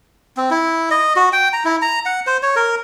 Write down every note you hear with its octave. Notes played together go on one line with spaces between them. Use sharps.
C4
E4
D#5
F#4
G5
A#5
E4
A#5
F#5
C5
C#5
A#4